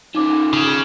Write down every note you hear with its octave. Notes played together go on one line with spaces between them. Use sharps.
F3 C#4 D#4 D6
C#3